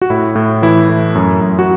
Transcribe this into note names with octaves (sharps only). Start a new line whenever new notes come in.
F#4
A2 E4
A2
E3 E4
A3
F#2
F#2
F#4